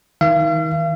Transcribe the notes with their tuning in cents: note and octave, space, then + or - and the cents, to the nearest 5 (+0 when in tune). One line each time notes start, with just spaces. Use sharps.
D#3 +35 F5 -45